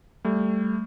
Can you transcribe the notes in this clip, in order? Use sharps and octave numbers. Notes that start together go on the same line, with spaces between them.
G3 A3